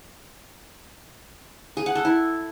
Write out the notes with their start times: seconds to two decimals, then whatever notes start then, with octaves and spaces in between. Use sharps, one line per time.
1.77 G#4
1.86 F#5
1.95 A4
2.05 E4